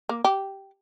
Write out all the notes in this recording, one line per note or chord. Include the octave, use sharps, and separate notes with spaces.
A#3
G4